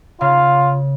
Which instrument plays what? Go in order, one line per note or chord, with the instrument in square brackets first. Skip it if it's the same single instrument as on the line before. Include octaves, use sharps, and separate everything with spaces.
[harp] C#3 [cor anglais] F4 [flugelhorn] F5